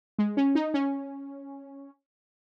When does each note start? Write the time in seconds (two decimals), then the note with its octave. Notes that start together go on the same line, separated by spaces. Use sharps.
0.19 G#3
0.37 C#4
0.55 D#4
0.74 C#4